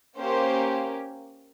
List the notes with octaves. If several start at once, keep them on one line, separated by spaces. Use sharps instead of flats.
A#3 C#4 G4 C5